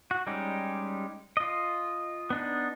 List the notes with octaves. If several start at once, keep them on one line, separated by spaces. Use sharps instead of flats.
F#4
G3 G#3 C#4 D#4 G4
F4 D#5
B3 D4 D#4